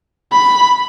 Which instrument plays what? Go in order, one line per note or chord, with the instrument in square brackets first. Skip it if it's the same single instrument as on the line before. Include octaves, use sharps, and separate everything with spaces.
[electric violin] B5